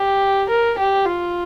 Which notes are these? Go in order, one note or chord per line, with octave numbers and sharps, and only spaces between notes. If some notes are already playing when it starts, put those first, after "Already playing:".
Already playing: G4
A#4
G4
F4